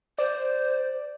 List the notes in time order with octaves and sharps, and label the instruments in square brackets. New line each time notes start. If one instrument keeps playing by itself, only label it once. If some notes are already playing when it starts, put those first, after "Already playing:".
[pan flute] C5 [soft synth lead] D5